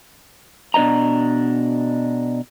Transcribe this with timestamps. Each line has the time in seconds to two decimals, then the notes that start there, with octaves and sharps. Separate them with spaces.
0.74 B2 D4 C#5 D#5 A#5